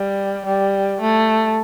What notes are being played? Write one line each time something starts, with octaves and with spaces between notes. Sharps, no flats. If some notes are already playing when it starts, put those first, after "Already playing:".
Already playing: G3
G3
A3